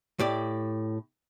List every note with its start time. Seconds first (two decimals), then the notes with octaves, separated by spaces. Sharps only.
0.19 A2 G4 D5